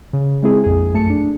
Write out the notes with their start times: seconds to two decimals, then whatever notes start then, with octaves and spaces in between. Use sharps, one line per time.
0.13 C#3
0.43 G#3 C4 E4 G#4
0.64 A#1 F2 G#4
0.94 F#2 A3 A5 C#7
1.10 D4